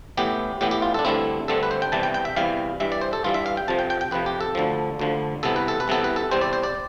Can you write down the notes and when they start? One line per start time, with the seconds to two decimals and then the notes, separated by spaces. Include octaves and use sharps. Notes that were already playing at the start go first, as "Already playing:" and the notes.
0.17 A2 E3 B3 G4
0.61 A2 E3 B3 G4
0.71 G4
0.82 F4
0.94 D4 A4
1.05 G2 D3 A3 C4 E4
1.48 G2 D3 A3 C4 A4
1.63 B4
1.71 C5
1.82 G5
1.92 E2 C3 E3 G3 A5
2.03 G5
2.14 G5
2.25 E5
2.36 E2 C3 E3 G3 F5
2.80 G2 E3 G3 E5
2.92 D5
3.01 C5
3.13 A4
3.24 G2 E3 G3 F4
3.34 E5
3.46 F5
3.57 G5
3.68 F2 C3 F3 A5
3.79 G5
3.90 G5
4.01 G5
4.11 F2 C3 F3 B4
4.26 G4
4.41 A4
4.55 D2 D3 F3
4.99 D2 D3 F3
5.43 C2 C3 E3 B3 A4
5.56 B4
5.68 A4
5.80 B4
5.88 C2 C3 E3 B3 A4
6.04 B4
6.16 A4
6.31 E2 C3 G3 C4 C5
6.41 D5
6.53 C5
6.63 D5